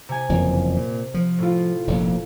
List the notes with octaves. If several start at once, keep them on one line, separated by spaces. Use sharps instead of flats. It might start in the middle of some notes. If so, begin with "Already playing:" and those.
C3 G#5
F#1 F2 E3
A#2
F3
A2 F4
F1 A#1 F2